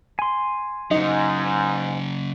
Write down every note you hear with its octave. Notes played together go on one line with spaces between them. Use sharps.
G#5 C6
G#2 C#3 F#3 D#4